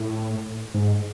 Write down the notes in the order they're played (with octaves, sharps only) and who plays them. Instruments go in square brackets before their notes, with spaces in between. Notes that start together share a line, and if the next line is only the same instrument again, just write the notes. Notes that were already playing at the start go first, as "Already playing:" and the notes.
Already playing: [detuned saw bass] A2
G#2